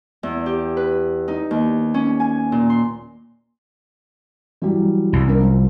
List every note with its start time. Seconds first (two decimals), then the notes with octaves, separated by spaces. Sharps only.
0.23 E2
0.46 G4
0.77 B4
1.28 D#4
1.51 D#2
1.94 C#4
2.20 G#5
2.52 A#2
2.70 C6
4.62 E3 F#3 G3
5.13 C2
5.27 C#4 D4 A#4
5.40 F3